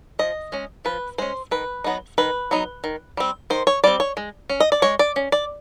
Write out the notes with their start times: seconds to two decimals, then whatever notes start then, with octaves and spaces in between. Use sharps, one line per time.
0.19 F3 D#5
0.52 G#3 C#4
0.85 F3 B4
1.18 G#3 C#4 C5
1.51 D#3 B4
1.84 F#3 B3 D#4
2.18 D#3 B4
2.51 F#3 B3 D#4
2.84 D#3
3.17 G3 C4
3.50 D#3 C5
3.67 C#5
3.84 G3 C4 D5
4.00 C#5
4.17 G#3
4.50 C#4
4.60 D#5
4.72 D5
4.82 G#3 C#5
4.99 D5
5.16 C#4
5.32 D5